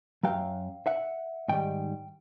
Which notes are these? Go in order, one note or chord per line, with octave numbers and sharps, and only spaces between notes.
F#2 D#3 F#3 F5 G5
E5 F#5
G#2 D#3 G3 G5